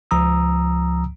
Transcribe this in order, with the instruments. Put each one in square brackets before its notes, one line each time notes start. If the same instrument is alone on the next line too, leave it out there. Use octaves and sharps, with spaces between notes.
[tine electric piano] C#2 F3 A#5 D#6 E6